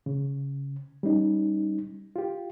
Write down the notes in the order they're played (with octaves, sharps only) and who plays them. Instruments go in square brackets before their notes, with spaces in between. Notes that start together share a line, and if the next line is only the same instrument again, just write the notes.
[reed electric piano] C#3
G3 C#4 D#4
F4 G4